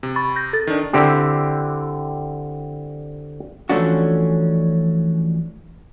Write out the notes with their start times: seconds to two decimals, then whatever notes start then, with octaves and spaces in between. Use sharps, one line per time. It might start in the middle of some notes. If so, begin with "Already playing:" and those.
0.03 C3
0.16 B5 C#6 A6
0.36 G6 A#6
0.53 A4 A6
0.67 D#3 D4
0.93 D3 C4 E4 G4
3.70 E3 F3 A3 C#4 D4 F#4